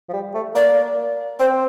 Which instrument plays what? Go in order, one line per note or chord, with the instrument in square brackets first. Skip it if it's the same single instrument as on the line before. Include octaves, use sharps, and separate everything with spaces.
[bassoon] F3
G3
A3
[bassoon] A#3 [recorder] D5
[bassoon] C4 [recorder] C5